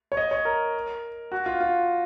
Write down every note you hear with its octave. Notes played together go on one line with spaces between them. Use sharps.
C#5
D#5
C#5
A#4
F#4
F4
F4